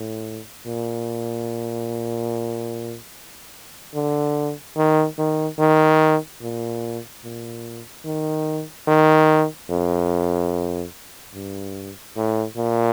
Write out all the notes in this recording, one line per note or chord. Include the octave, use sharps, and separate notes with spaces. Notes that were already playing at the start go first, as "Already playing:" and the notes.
Already playing: A2
A#2
D3
D#3
D#3
D#3
A#2
A#2
D#3
D#3
F2
G2
A2
A#2